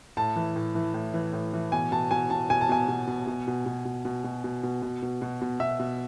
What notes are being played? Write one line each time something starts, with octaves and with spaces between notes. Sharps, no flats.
A2 A5
E3
A2
E3
A2
E3
A2
E3
B2 G#5
B2 A5
B2 G#5
B2 A5
B2 G#5
A5
B2 G#5
B2
B2
B2
B2
B2
B2
B2
B2
B2
B2
B2
B2
B2
B2
B2 E5
B2